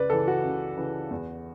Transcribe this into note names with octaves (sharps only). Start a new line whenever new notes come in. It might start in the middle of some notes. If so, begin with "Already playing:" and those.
Already playing: C#2 B4 D5
C#3 E3 A4
F#4
C#2
C#3 E3
E2